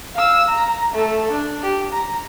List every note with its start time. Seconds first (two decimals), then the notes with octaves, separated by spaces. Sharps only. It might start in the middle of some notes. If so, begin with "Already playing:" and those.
0.14 F5 E6
0.48 A#5
0.93 A3 A4
1.32 D4
1.63 G4
1.92 A#5